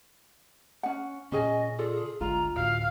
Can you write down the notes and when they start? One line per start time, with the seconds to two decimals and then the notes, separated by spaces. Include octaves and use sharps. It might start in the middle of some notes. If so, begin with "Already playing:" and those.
0.83 C#4 F#5
1.32 A#2 C#3 C#4 G#4 D#5 G#5
1.79 F4 G#4 A4 D5
2.21 G#1 D2 G#3 F4 A#5
2.56 D2 A2 F#4 F5